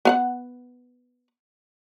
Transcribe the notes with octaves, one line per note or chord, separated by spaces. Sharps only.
B3 F5 F#5